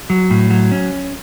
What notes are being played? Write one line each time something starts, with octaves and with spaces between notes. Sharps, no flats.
F#3
A2
F#3
C#4